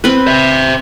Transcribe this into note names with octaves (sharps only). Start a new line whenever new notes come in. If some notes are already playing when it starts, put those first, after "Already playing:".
C4 B4
C5 E5